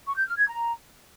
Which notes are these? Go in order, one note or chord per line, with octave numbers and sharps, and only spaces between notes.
C#6
G6
F6
G#6
A#5